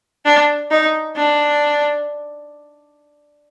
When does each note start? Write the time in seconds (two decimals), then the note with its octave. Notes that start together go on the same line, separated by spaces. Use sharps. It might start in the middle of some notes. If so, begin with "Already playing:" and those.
0.25 D4
0.71 D#4
1.16 D4